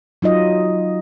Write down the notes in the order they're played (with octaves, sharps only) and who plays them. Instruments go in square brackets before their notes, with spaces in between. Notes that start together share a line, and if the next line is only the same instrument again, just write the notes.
[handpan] F#3 D#4 F4 D#5